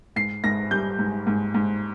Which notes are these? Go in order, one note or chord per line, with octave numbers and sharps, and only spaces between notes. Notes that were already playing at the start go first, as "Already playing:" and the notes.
G#2 C7
G#2 A#6
G3 G6
G#2
G#2
G#2